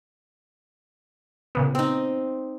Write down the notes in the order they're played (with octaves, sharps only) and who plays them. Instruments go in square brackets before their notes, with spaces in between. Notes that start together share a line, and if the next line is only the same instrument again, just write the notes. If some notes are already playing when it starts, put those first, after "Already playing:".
[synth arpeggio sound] A#2 C#3 B3
[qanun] C4 D#4